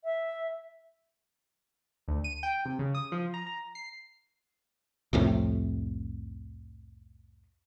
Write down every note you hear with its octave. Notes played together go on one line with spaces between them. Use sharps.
E5
D2
D#7
G5
C3
C#3
D#6
F3
A#5
A#5
C7
C2 F2 A2 C3